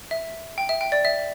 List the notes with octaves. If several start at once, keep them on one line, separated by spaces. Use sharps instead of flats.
E5
G5
E5
G5
D5
E5